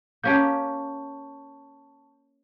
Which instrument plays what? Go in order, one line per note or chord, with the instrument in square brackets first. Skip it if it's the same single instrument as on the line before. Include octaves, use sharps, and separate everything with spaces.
[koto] A#3 C#4 G4 [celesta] A5 C#6 G6